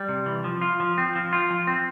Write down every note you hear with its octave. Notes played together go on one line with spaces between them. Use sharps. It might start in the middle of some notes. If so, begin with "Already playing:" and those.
Already playing: G3
C3
E3
F3
F4
F3
C4
F3
F4
F3
C4